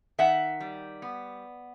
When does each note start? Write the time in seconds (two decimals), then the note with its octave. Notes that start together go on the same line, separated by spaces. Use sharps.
0.18 D#3 E5 F#5
0.60 G3
1.02 B3